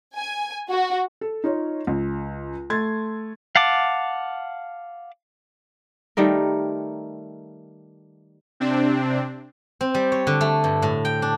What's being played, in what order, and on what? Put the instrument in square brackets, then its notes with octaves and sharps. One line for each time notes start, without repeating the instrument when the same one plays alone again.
[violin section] G#5
F#4
[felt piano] A4
D#4 F4 C#5
C#2
A3 C6 G#6 A6
[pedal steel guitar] F5 F#5 A5 D6
[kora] D#3 G3 A3 A#4
[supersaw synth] C3 C4 D4
[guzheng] C4
G3
C#5
D3
A3
G2
A2
G5
D4